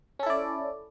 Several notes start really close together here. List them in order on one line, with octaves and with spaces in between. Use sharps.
C#4 A4 E4 D5